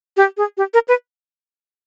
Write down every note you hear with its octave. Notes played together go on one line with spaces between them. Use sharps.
G4
G#4
G4
A#4
B4